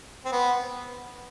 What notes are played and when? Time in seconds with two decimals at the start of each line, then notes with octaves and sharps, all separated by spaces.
0.25 C4
0.32 B3